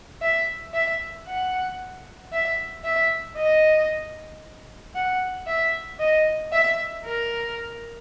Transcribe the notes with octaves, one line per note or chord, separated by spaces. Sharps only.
E5
E5
F#5
E5
E5
D#5
F#5
E5
D#5
E5
A#4